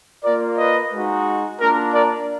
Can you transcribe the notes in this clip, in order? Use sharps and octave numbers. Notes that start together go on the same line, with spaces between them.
A#3 F4 A#4 D5
B4 D#5
G#3 D#4 F#4
A#3 D4 F4 A#4
A#4 D5